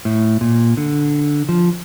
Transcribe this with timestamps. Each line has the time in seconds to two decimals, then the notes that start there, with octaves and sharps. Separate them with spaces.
0.05 A2
0.41 A#2
0.77 D3
1.49 F3